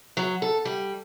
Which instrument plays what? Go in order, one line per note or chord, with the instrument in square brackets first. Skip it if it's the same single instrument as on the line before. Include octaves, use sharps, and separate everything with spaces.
[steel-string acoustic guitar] F#3
A4
G3